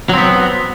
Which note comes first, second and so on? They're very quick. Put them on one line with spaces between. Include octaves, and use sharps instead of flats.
F#3 C4 B3